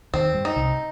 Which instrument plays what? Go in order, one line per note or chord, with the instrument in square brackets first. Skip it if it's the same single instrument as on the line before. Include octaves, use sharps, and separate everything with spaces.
[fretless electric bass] D#2 D#3 [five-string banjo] C4
[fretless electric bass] G2 G3
[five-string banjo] D#4
[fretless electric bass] C2 C3